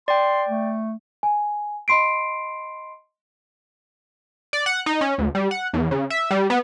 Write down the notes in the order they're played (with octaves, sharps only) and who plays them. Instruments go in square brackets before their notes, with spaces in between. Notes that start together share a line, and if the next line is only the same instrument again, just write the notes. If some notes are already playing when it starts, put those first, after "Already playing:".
[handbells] D5 G5 [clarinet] C6
[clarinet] A3
[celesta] G#5
D#5 B5 C6 C7 D7
[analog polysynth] D5
F#5
D#4
C#4
D2
G3
F#5
E2
C#3
E5
G3
B3